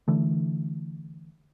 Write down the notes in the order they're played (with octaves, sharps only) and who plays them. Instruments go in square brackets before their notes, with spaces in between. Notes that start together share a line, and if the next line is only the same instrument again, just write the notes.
[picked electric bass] D3 E3 A3